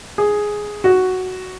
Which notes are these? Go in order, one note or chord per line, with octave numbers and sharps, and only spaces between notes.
G#4
F#4